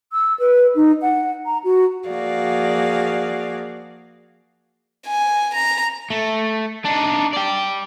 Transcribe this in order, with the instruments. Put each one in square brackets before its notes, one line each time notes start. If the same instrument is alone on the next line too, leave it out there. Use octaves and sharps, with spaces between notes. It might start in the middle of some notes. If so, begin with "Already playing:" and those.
[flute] E6
B4
D#4
F#5
A#5
F#4
[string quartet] F3 A#3 F#4 G#4 D5 F5
[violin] G#5
A#5
[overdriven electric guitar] A3
D4 D#4
D5 G5